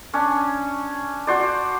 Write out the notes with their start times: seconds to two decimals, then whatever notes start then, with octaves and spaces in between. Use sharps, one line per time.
0.13 C#4 D4
1.27 F#4 C5 D5